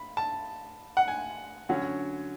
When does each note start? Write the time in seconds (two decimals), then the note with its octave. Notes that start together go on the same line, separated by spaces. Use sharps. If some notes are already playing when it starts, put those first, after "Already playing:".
Already playing: B5
0.17 A5
0.97 F#5
1.08 G#5
1.69 D3 F#3 C#4